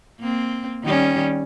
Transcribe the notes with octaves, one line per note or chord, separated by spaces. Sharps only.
A#3 C4
D#3 G3 C#4